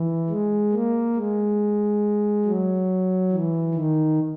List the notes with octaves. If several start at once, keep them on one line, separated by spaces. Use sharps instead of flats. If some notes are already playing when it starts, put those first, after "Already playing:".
Already playing: E3
G#3
A#3
G#3
F#3
E3
D#3